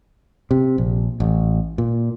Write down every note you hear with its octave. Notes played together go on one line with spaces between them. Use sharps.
C3
A#1
A1
A#2